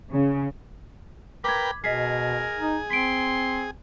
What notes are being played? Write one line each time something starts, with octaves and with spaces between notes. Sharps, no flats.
C#3
A#4 B4 G5 B5 D6 G#6
B2 G#4 A#4 D#5 B6 C7
D#4
C4 C6 B6 D7